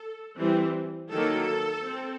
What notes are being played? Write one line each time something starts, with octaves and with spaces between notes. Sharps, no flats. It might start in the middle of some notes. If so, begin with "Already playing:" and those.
Already playing: A4
E3 G3 C4
D#3 F#3 A#3 A4
C4